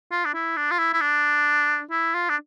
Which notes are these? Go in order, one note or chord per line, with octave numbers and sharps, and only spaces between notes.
F4
D4
E4
D4
F4
E4
E4
D4
E4
F4
D4